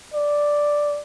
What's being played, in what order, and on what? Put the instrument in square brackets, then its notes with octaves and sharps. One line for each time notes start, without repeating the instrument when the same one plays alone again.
[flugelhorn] D5